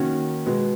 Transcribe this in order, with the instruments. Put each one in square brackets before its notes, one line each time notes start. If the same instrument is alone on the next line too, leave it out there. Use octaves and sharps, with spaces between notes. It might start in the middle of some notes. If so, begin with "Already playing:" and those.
Already playing: [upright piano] D#3 A#3 C#4 F#4
B2 G#3 B3